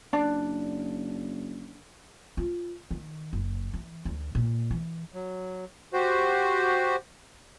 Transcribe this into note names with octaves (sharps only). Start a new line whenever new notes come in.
F#1 D4 D5
F4
D#3
F#1
E3
D2
A#2
E3
F#3
F#4 G4 C5